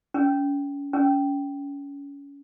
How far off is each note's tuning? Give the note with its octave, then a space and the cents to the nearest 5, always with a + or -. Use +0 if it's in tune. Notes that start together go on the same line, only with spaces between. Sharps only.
C#4 +30
C#4 +25